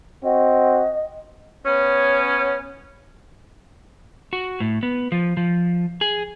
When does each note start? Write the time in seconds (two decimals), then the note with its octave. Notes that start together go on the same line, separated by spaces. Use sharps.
0.24 C4 F#4 D#5
1.66 B3 C#4
4.33 F#4
4.60 A2
4.83 B3
5.12 F3
5.37 F3
6.01 G#4